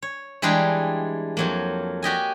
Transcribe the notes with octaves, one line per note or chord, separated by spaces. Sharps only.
C#5
E3 G3 G#3 D4 G#4 G5
F2 F#3 A#3
F#4 G4 D#5 G#5